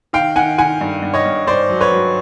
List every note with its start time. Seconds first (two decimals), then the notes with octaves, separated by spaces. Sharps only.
0.13 D#3 F5 G5
0.36 D#3 F#5 G#5
0.58 D#3 F#5 G#5
0.81 G2
1.02 G2
1.14 C#5 D#5
1.26 G2
1.47 G2 C5 D5
1.70 F#3
1.81 B4 C#5
1.92 F#3